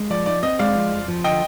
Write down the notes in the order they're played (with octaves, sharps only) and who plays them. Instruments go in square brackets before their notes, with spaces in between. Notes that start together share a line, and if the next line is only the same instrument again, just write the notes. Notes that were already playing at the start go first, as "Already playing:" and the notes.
Already playing: [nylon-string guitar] G#3
[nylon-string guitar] F3 [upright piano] D5
[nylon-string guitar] D#4 [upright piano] D5
[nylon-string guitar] C4 [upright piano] D#5
[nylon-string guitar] G#3 [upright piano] D5 F5
[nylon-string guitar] F3
F2
F3
[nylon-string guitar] D3 [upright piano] D#5 G5